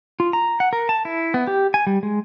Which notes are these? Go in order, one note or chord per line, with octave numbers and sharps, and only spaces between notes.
F4
A#5
F#5
A#4
A5
E4
B3
G4
G#5
G3
G#3